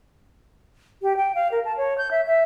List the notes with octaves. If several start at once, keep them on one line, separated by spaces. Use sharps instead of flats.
G4
G5
F5
A#4
A5
C#5
G6
E5
E5